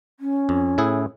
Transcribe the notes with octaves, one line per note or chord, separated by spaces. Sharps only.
C#4
F2
A2 E4 G#4